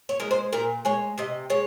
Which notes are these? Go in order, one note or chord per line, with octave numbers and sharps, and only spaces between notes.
C#5
G#3 A#4
C5
A#2 A#4
G#3 C#5
C3 D#5
G#3 C#5